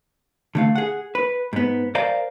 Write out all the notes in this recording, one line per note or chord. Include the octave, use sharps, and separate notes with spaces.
D3 A3 F5
G#4 F#5
B4
G#2 B3
A#4 C5 D5 F5 G#5 A#5